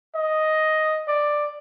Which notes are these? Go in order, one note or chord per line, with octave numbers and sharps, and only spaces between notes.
D#5
D5